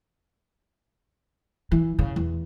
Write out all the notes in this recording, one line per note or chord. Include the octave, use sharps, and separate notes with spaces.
E3
C#3
E2